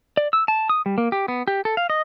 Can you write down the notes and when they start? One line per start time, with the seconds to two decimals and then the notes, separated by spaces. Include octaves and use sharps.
0.17 D5
0.33 E6
0.48 A5
0.69 D#6
0.86 G3
0.98 A#3
1.12 G4
1.28 B3
1.48 G4
1.65 A4
1.77 F5
1.90 D#5